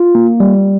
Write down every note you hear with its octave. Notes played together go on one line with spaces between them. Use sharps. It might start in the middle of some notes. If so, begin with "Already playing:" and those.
Already playing: F4
A#3
G3